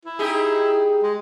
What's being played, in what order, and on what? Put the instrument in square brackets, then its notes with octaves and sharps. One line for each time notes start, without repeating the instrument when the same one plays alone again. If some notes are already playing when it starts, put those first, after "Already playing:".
[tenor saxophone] E4
[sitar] D#4 G4 G#4
[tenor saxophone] G#3